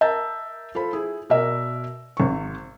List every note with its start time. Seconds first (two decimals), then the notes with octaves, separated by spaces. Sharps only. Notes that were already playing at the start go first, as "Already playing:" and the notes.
0.01 A#4 E5 A5 A#5 G6 A6
0.75 F4 A4 C5 B5
0.93 E4 G#4
1.30 B2 A#4 D5 E5
2.17 G#1 C#6